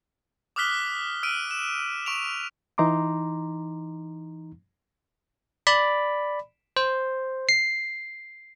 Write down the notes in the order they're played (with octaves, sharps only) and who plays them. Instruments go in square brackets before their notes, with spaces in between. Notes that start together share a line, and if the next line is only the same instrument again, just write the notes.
[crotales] D6 D#6 F6 F#6 B6 G7
E6 F6 D7 D#7
E7
C#6 D7 F7
[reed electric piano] E3 D#4 A#5 C6 D6
[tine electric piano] D5 B5
C5
C7